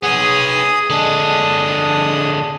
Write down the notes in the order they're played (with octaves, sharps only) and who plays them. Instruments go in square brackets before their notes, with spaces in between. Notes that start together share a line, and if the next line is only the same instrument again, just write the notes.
[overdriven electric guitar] B3 C#5 [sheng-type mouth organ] G#4 G#5 D#6
[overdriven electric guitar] D3 G#3 [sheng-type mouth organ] D4 D#6